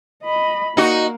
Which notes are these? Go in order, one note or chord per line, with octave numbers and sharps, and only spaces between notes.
D#5 B5
A#3 D#4 F#4